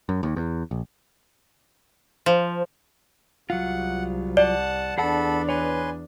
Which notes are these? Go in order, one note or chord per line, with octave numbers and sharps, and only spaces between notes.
F#2
D#2
E2
A#1
F3
C2 F#3 F4 F#5
D5 F#5 A5
E2 D4 G#4 A4 F#5 A5 B5
B4 C#5 G#5 C6